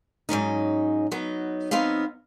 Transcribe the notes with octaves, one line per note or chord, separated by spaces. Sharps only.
G#2 F#3 C#4 D#4
F#3 B3 D#4
F#3 B3 C4 D#4 F5